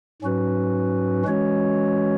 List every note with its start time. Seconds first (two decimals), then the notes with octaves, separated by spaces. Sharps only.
0.22 G#2 F#3 C#4 F#4 B4
1.25 E3 G#3 C#4 F#4 C#5